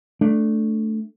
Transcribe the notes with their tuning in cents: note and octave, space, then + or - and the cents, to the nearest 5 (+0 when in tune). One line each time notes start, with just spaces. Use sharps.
A3 +0 D4 +0